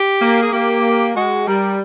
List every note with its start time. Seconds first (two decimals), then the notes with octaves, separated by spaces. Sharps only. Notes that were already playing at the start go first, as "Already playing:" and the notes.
Already playing: G4
0.22 A#3
0.42 G#4
0.53 A#3 G4
1.15 G#3 F#4
1.48 G3 A#4